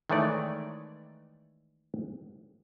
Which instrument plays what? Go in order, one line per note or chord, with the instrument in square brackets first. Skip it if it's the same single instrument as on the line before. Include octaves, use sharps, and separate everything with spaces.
[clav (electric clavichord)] D#3 E3 G#3 A3 C#5 D5